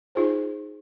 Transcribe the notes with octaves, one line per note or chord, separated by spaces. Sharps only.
D#4 F4 G#4 C5